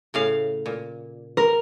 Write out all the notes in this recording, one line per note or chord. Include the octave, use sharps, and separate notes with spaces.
A2 C#3 F5
A#2
A#4